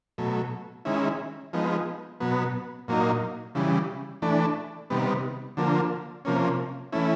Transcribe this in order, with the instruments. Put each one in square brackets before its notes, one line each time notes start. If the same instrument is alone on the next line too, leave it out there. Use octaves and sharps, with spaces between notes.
[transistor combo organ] B2 F#3 A3
D#3 G#3 C#4 E4
F3 G#3 B3 D#4
B2 F#3 B3
A#2 F#3 A#3 D#4
C#3 E3 G3
E3 A3 D4
C3 D#3 G3 B3
D3 F3 A#3
C3 F3 A#3 C#4
E3 A3 C#4 E4